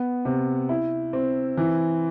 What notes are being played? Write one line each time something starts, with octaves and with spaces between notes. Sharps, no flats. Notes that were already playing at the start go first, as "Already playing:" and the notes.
Already playing: B3
C3
E4
C4
E3